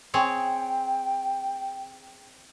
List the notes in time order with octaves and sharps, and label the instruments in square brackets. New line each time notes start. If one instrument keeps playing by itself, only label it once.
[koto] C4 G#4 C#5 [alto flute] G5